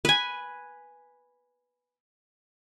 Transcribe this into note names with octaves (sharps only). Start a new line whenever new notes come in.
B4 G#5